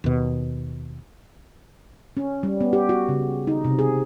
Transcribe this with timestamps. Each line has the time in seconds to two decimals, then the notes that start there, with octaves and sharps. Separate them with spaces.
0.04 D#2 B2
2.17 C#4
2.43 G3
2.61 B3
2.73 G4
2.89 F#4
3.09 C#3
3.47 D#4
3.65 C3
3.79 G#4